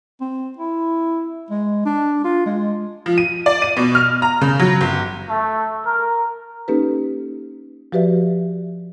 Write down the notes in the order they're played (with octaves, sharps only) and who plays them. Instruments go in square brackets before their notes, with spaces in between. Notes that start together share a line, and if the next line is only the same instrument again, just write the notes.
[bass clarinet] C4
E4
G#3
D4
F4
G#3
[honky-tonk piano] F3
D#7
D5
D#7
B2
F6
A#5
C#3
F#3
G1
[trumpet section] A3
A#4
[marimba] A#3 C#4 D#4 G4 A4 B4
F3 F#4 G4 B4 D5 E5